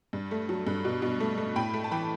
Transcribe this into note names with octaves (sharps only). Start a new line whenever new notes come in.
G2
A3
F#3
G2
B2
B2
A3
A3
A2 G5 B5
A3
A5
E3 G5 B5